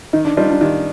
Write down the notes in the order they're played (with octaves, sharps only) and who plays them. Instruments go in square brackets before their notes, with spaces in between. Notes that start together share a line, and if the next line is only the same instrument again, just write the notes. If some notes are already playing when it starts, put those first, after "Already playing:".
[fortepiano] D#3 [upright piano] D#4
[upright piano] D4
[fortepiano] G3 D4 F4 [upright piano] D#4
[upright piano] D4 F4
[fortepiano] D#3 [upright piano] D#4 G4